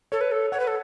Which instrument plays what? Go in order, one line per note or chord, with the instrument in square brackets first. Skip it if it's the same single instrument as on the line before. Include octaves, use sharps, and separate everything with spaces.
[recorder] A4 [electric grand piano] C#5
[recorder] B4
A4
[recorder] C#5 [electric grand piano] F#5
[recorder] B4
A4